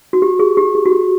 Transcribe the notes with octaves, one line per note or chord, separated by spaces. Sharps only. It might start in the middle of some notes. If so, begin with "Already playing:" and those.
F#4
G4
G#4
G4
G#4
F#4
G4